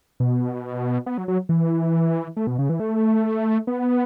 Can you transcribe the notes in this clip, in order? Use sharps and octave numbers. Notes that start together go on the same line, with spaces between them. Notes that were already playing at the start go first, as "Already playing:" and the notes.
B2
B3
F#3
F#3
E3
A3
B2
C#3
E3
A3
B3